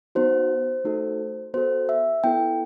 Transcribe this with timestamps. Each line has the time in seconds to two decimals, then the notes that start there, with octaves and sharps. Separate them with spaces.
0.15 B3 D#4 F#4 C5
0.84 A3 D#4 F#4 A4
1.54 B3 F#4 A4 C5
1.89 E5
2.24 B3 E4 A4 G5